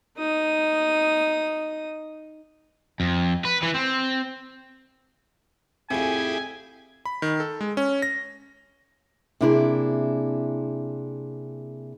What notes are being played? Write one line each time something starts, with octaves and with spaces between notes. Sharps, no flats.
D#4 D#6
F2
B4
E3
C4
F2 A2 C4 E4 G4 G#4 G#5
B5
D#3
A4
G#3
C#4
A#6
C3 A#3 D4 E4 G#4